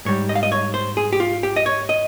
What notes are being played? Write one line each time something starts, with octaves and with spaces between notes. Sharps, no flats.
G#2 G3 C#5
D#5
F5
D#5
C#5
C5
G#4
G4
F4
G4
D#5
C#5
D#5